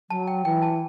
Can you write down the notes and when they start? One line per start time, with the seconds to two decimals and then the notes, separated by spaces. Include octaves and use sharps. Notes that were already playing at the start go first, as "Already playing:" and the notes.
0.10 F#3 A5
0.27 G5
0.45 E3 G5
0.62 A5